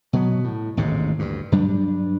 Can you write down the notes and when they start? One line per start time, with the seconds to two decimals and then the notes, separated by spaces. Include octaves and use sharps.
0.13 B2 F#3 B3
0.44 A2
0.77 A1 D#2 G#2 C3
1.19 D2 G2
1.52 G2 F#3 G3 D4